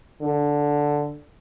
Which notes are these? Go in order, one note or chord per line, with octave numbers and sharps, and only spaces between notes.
D3